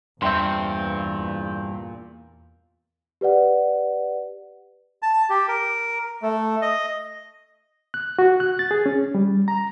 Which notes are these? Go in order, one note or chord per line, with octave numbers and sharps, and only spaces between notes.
E2 G2 A#2 C4 E5 G5 C6
G4 B4 D5 F#5
A5
G4
A#4
A3
D#5
F#6
F#4
F#6
A6
G#4
C#4
G3
A#5